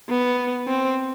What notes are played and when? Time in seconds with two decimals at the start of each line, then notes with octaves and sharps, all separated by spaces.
0.09 B3
0.68 C4